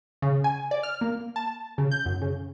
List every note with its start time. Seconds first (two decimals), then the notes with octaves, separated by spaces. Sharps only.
0.22 C#3
0.44 G#5
0.71 D5
0.83 F6
1.01 A#3
1.36 A5
1.78 C#3
1.91 G6
2.06 F#2
2.22 C#3